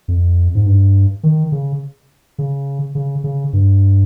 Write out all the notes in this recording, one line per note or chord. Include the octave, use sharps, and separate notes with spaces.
F2
G#2
G2
D#3
C#3
C#3
C#3
C#3
G2